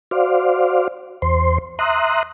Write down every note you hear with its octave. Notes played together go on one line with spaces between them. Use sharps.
F#4 C5 D5 F5
E2 C5 C6
E5 A#5 C6 D#6 F#6